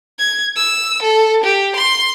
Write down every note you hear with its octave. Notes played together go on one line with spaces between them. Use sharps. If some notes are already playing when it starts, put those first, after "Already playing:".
G#6
E6
A4
G4
C6